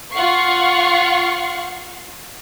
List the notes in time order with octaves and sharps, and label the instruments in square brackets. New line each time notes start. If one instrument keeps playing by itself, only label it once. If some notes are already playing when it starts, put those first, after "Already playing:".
[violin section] F4 F5 F#5 C#6 C7